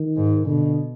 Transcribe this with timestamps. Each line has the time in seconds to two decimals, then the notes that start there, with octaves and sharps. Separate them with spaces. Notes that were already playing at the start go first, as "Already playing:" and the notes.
Already playing: D#3
0.16 G#2
0.46 B2 D3